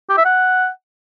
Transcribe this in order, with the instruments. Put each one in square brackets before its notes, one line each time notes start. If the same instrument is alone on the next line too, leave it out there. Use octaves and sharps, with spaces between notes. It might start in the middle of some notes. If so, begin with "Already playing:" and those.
[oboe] G4
E5
F#5